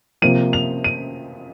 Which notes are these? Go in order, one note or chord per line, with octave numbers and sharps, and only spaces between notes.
C3 F3 A#3 D#7
F7
D#7